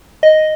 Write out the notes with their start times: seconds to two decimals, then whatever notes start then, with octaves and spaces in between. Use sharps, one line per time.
0.23 D#5